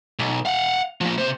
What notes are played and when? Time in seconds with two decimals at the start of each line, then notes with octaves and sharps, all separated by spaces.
0.19 B1
0.45 F5 F#5
1.01 F3 A#3
1.18 C3 C5